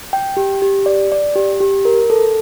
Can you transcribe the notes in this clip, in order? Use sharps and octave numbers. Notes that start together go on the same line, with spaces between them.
G5
G4
G4
D5
D5
G4
G4
A#4
A4